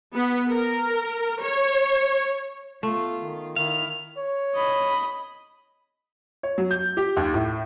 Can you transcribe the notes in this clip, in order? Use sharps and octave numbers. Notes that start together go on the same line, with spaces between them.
B3
A#4
C#5
A3 B3 F4
D#3
D#3 E4 F5
C#5
D#5 B5
C#5
F#3
G6
G4
D#2
A2